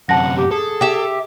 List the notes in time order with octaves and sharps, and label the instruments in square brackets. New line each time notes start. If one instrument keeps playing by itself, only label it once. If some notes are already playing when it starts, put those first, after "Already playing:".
[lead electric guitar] F#2 C3 [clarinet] F#5 [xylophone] A5 A#6
[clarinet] G4
[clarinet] G#4 [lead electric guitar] A4
[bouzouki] G4 E5